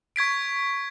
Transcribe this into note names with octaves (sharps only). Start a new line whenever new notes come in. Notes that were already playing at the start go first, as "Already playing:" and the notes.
C#6 G#6 B6 D7